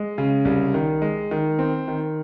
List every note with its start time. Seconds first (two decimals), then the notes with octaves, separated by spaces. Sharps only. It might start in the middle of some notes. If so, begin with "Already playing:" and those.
Already playing: G#3
0.18 C#3
0.45 C2
0.74 D#3
1.02 G#3
1.31 D#3
1.59 C4
1.88 D#3